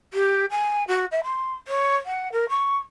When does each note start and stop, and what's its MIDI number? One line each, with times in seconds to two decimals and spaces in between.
0.14 0.45 67
0.51 0.84 80
0.88 1.05 66
1.12 1.20 76
1.24 1.55 84
1.68 1.96 73
2.06 2.32 78
2.32 2.49 70
2.49 2.76 85